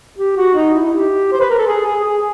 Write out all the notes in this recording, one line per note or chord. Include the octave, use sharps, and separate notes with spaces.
G4
F#4
D#4
E4
G4
C5
B4
A#4
A4
G#4
G#4
G#4